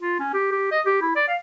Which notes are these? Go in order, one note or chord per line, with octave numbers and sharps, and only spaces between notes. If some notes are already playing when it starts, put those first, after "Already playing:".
F4
C#4
G4
G4
D#5
G4
E4
D5
F5